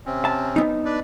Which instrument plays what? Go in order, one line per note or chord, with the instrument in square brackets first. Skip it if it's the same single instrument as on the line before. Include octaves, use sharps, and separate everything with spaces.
[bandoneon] C3 C4 C#4
[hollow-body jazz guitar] A5
B3 D#4
[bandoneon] D4 B4 D5